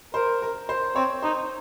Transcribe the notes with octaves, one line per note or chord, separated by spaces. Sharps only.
A#4 C5
A#4
C5
C4 C#5
D#4 C5